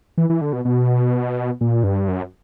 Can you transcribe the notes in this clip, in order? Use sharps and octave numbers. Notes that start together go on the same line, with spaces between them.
E3
E3
D3
B2
B2
A#2
G2
F#2